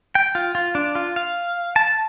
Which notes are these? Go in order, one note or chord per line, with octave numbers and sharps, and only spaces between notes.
G5
F4
F4
D4
F4
F5
A5